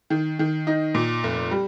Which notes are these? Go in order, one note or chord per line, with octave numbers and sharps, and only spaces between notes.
D#3
D#3
D#4
A#2
F1
G3